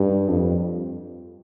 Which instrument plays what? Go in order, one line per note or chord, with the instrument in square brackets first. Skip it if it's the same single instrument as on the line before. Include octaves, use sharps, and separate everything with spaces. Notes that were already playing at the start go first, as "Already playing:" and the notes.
Already playing: [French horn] G2
F2